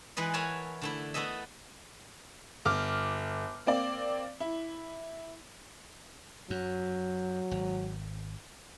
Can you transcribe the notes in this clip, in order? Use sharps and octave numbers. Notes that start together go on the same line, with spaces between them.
E3 G#3 B4 D#5
A#4 C#5 E5 F#5 G#5 A5
D3 A3 E4
A3 B3 A4 D#5 E5
G1 D6 F6
A#3 C4 D5
E4
F#2 F#3
G#1